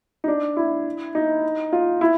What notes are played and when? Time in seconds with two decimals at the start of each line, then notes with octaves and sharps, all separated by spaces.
0.24 D#4
0.28 D4
0.57 E4
1.15 D#4
1.73 F4
2.01 E4